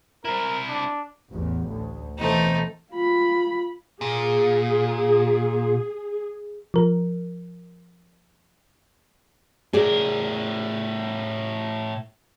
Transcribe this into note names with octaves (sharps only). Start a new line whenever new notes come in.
C4 E4 A#4
D4
A1 E2
D2
B2 E3 A3 C4 D#4
F4 B5
A#2 G#4
F3 A#4
A2 G#4 A#4 D5